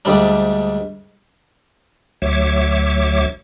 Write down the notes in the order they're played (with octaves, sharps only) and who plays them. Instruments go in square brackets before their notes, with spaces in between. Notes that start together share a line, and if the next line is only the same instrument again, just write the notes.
[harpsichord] D2 G#2 G3 D4
[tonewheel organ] D2 F#3 C#5 E5 D6